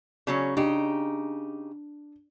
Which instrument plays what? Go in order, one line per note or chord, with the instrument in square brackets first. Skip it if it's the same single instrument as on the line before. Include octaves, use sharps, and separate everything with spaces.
[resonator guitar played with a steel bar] C#3 F#3 C#4
[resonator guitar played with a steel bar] C#3 D#4 G4 [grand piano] D4